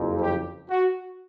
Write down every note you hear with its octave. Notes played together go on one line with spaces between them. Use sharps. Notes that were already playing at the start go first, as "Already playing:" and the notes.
Already playing: F#1 F2 C#3
G4
F#4